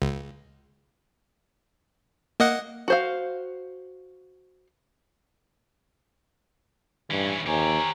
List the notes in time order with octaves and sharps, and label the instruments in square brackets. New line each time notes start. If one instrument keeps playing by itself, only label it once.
[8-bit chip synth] C#2
A#3 D#5 F#5
[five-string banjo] F#4 C5 F5
[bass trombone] G2 [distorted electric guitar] E3 C#4
[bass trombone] D#2 [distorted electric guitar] G4 C#5 [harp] C5 G#5 A#5